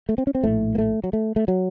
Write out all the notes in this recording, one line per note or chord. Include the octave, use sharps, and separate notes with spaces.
A3
C4
C#4
C4
A#1 A2 A3
A#3
A3
F#3
A3
A3
F#3